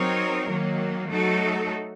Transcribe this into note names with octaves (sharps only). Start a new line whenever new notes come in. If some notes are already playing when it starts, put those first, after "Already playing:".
Already playing: F#3 C4 D#4 A#4 C#5
D#3 F#3 A#3
F#3 A3 D#4 F#4 A4